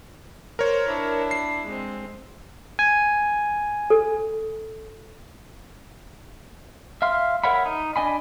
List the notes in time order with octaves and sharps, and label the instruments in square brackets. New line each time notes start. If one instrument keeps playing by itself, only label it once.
[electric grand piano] A#4 C#5 [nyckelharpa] C5
[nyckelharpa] D4 E4
[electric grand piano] C7
[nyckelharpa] G#3 C4
[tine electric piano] G#5
[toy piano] A4
[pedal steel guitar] E5 F5 C6
A#4 C#5 E5 F#5 B5
D#4
D4 D#5 G#5 B5